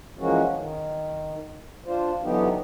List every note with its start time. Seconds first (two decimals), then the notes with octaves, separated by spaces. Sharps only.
0.19 E3 F3 G#3 A#3 C#4 F#4
0.54 D#3
1.86 D4 F4 C5
2.23 D3 E3 F#3 B3 D#4 G4